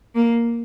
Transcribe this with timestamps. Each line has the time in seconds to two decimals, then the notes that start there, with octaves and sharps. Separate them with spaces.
0.15 A#3